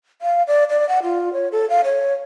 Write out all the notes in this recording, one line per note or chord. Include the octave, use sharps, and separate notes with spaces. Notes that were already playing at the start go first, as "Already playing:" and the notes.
F5
D5
D5
F#5
F4
C#5
A4
F5
C#5